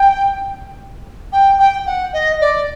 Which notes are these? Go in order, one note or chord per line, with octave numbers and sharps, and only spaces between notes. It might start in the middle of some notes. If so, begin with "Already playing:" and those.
Already playing: G5
G5
G5
F#5
D#5
D5